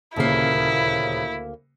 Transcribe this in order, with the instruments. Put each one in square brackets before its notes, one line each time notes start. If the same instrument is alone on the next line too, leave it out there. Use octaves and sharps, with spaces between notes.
[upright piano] D#1 C#3 C7 [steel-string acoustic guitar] D2 A#3 [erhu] E4